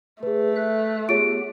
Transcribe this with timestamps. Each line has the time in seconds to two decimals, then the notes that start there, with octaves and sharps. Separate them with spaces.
0.23 A3 G#4 B4
0.56 A4 E5 F#6
1.09 B3 F4 G4 G#4 C#5 D7